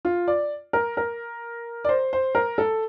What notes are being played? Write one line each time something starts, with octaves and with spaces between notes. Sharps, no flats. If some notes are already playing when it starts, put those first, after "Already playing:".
F4
D5
A#4
A#4
D5
C5
C5
A#4
A4